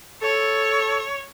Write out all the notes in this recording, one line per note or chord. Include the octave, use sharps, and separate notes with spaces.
A4 C#5